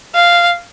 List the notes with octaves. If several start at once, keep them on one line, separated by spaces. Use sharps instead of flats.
F5